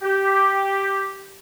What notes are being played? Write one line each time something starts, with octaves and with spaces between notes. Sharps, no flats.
G4